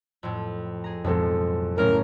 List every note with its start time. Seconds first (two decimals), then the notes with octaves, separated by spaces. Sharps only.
0.23 F2 A2
0.84 G#4 A#5
1.04 B1 F2 A2 G#3 A4
1.78 F#1 A2 C#4 A#4